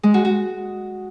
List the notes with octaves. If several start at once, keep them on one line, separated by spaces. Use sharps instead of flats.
G#3
F#4
F#4